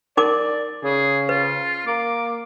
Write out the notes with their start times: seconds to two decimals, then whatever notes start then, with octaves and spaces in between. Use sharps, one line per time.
0.17 D#4 A#4 D5 D6
0.84 C#3 G#4
1.29 F4 B4
1.87 A#3 D6